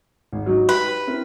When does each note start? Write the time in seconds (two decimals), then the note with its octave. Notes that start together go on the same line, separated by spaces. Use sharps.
0.33 G#1
0.46 F#3 D#4 F#4
0.69 G4 B4
1.07 C4 E4 A#4